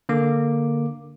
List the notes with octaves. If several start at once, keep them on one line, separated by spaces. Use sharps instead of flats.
D3 A#3 D6